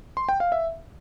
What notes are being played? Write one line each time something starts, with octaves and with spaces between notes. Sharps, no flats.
C6
G5
F5
E5